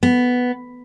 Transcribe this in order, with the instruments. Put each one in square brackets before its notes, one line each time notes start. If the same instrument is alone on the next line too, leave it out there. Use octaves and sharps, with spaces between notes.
[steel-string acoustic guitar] B3